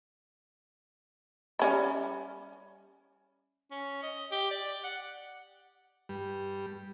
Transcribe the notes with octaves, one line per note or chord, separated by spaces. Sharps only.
G3 C#4 E4
C#4
D#5
G4
D5
F#5
G2 G3